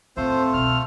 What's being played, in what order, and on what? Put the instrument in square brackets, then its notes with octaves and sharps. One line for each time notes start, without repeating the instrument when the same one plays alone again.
[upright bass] A2 E4 [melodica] A3 F4 A4 [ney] C4 [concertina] C5
[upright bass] C2 B2 [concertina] F6